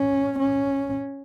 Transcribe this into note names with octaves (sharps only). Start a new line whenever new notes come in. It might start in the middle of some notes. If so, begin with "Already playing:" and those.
Already playing: C#4
C#4